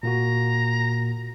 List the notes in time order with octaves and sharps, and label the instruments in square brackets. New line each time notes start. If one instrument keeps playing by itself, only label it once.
[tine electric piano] A#2 A#3 F#4 [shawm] A#5